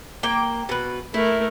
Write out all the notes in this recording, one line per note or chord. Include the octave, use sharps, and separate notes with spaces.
A#3 G5
B2 B4
A3 E4 A#4